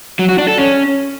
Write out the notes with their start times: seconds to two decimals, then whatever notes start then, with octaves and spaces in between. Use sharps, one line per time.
0.19 F#3
0.29 F#4
0.38 D4
0.48 A4
0.58 C#4